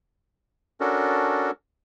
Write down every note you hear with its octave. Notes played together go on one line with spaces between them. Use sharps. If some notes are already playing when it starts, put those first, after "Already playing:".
C#4 D4 F#4 A4 A#4